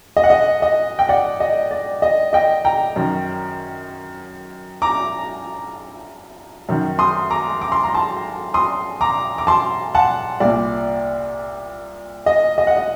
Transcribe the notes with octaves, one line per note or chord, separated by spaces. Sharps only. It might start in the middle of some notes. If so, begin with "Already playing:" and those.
D#5
F#5
D#5
D#5
G5
D5 F#5
D#5
D5
D#5
D#5 G5
G5 A#5
F#2 D#3
A#5 D6
F#2 D#3
C6 D#6
A#5 D6
D6
C6
A#5
A5 C6
C6 D#6
A#5 D6
D6
A5 C6
F#5 A5
C2 A#2 D5
D#5
D#5
F#5
D#5